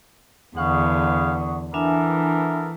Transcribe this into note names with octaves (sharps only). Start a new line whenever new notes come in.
E2 D3 G#4 B4 F5 F#5 C#6 D#6
E3 B3 D4 A4 A#4 E5 G#5